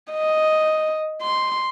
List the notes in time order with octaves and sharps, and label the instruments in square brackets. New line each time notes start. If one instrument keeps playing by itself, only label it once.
[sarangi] D#5
C6